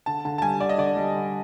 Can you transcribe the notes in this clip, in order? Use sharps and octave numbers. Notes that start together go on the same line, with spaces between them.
D3 A5
D3 A5
A5
G3 G#5
D3 D5
D#5
D3 D5
G3
D3